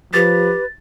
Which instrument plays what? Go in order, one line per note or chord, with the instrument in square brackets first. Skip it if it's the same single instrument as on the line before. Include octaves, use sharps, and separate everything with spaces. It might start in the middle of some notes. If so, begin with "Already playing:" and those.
[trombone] F3 [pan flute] G4 [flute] B4 [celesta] A6